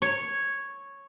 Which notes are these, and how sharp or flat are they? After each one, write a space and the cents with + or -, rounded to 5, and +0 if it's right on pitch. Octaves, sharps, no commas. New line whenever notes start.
C#5 -5